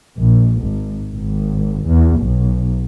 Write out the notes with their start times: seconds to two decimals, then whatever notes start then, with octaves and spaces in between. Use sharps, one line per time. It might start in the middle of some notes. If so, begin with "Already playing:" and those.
0.20 A#1
0.63 G#1
1.15 G#1
1.89 E2
2.21 B1